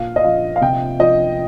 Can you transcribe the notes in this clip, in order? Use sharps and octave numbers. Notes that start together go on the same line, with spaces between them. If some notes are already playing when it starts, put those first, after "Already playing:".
Already playing: A#2 F5
D#5
F3 F5
F5
C3 G5
F3 D#5